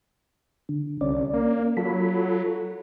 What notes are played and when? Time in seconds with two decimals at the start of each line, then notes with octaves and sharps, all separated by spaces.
0.69 D3
1.01 C2 C#4 D5
1.34 A#3
1.77 F#3 F4 A4 B5